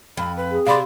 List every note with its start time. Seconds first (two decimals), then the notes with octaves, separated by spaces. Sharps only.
0.17 F2 B5
0.37 B4
0.52 G#4
0.67 C3 D5 F5 B5 C6